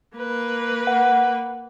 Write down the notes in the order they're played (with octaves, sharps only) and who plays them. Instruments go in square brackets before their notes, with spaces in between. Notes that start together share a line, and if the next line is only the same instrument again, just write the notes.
[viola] A#3 B4
[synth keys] F#5